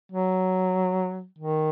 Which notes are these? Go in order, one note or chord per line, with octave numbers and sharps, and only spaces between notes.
F#3
D#3